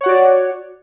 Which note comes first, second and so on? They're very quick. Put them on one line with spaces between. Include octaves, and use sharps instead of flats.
C#5 F#5 F#4 D5